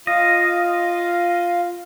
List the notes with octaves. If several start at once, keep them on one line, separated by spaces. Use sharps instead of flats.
F4 D#5 F5